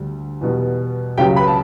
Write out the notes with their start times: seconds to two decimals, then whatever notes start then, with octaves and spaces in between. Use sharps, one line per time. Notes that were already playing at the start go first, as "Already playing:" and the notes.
Already playing: D2 D3 G3
0.41 E2 B2 G3
1.18 C#2 C#3 F#3 G4 G5
1.36 B4 B5
1.47 A5